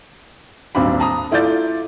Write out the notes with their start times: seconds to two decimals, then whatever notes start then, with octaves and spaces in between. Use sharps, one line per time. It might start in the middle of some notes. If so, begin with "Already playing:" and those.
0.75 D#1 B1 C4 D4 B5
1.00 A5 A#5 D#6
1.31 A3 E4 F4 D5 G6 A6